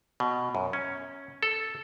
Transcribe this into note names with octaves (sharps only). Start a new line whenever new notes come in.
B2
F#2
C#4
A4